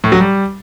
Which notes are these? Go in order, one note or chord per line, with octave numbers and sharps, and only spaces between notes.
A2
F#3
G3